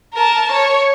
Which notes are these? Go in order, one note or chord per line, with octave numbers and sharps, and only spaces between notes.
A#4 A5
C#5